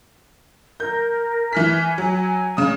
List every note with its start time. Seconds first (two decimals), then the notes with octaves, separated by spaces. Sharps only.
0.80 A#4 G6
1.53 E3 G#5 F6 B6
1.98 F#3
2.15 G#5
2.57 C#3 D#6